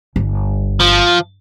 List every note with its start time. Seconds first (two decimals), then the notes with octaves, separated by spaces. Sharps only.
0.16 G1
0.81 F3